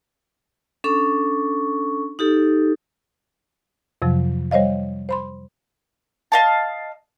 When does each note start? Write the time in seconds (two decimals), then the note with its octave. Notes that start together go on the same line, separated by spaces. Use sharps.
0.84 C#4 D4 A4 C#6
2.19 D#4 G4 A4
4.02 F2 C3 F3 F#3
4.51 G3 C5 C#5 D#5 F5
5.09 C5 B5 C6
6.32 D#5 F5 A5